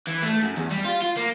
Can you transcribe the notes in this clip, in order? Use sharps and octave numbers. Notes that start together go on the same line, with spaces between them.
E3
A3
F#2
E2
G3
F4
F4
A#3